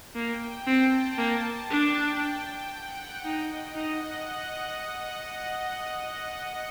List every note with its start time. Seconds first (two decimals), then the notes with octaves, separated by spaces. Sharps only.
0.14 A#3 G5
0.67 C4 A5
1.17 A#3
1.69 D4 G5
2.72 F#5
3.24 D#4 D#5
3.75 D#4 F#5